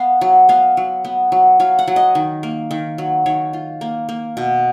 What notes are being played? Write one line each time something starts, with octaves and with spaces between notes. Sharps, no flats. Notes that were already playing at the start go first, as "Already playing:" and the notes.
Already playing: B3 F5
F#3
B3 F5
F#3
B3
F#3
F#3 F5
F#5
F#3
D#5
D#3
A#3
D#3
F#3
D#3 C#5
F4
A#3
A#3
B2